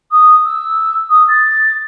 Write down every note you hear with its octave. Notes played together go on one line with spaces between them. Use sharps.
D#6
E6
D#6
A6